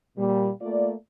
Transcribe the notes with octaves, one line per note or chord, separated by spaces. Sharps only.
A#2 G3
A3 A#3 F4 D5